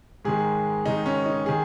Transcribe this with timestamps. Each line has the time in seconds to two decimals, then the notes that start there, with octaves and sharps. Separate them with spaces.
0.25 G#2 D#3 G#3 G#4
0.86 G#2 D#3 G#3 D#4
1.06 C#4
1.26 D#4
1.46 D#3 G#4